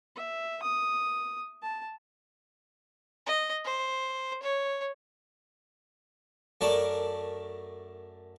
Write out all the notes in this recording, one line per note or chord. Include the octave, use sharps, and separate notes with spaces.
E5
D#6
A5
D#5
C5
C#5
F#2 A3 A#4 D5 A5